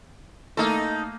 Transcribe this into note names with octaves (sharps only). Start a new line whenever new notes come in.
A3 A#3 D#4 A4